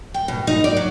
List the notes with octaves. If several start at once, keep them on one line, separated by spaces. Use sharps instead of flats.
G5
B2
D#4
D5
F#3